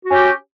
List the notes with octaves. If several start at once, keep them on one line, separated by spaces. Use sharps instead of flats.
C#4 F#4 G4